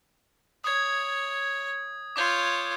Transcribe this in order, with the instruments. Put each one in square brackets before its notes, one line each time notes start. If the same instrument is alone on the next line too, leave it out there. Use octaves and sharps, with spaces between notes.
[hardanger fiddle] C#5 [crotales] D#6 G#6
[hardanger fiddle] F4 C#5 [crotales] D6 G6